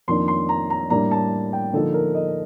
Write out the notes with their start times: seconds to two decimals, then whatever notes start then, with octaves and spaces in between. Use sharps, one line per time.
0.08 F2 D#3 A#3 D4 C6
0.28 C6
0.49 A#5
0.70 A#5
0.90 A2 G3 A#3 D4 A#5
1.11 A5
1.53 G5
1.73 D3 F3 A#3 D#4 A4
1.94 A#4
2.14 D#5